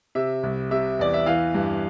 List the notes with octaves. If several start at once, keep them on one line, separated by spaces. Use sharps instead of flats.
C3 E5
C2
C3 E5
E2 D5
E5
E3 F5
G2